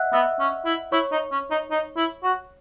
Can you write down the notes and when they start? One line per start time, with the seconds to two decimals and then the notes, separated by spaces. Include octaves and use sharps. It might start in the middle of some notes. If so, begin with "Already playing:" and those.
Already playing: D#5 E5 F#5 E6 F#6
0.13 B3 E5 E6
0.40 C#4
0.66 E4
0.92 E4 C#5 C#6
1.12 D#4
1.32 C#4
1.51 D#4
1.71 D#4
1.97 E4
2.24 F#4